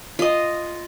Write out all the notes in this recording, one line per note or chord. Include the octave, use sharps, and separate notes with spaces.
F4 D#5